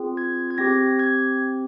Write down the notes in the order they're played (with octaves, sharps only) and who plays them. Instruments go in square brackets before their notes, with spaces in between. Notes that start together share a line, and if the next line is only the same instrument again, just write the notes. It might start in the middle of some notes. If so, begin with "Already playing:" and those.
Already playing: [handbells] C4 F4 G#4
G#6
G#6
C4 G4 A#6
G#6